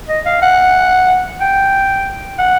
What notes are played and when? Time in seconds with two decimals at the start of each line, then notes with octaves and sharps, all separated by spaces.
0.09 D#5
0.26 F5
0.42 F#5
1.41 G5
2.38 F#5